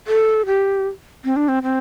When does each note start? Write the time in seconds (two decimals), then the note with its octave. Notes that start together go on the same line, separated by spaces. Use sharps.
0.07 A4
0.46 G4
1.25 C4
1.36 D4
1.48 C4
1.63 C4